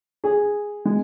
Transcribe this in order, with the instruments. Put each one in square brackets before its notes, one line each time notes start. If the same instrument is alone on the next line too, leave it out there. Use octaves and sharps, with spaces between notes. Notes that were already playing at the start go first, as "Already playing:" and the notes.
[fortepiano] G#4
G#3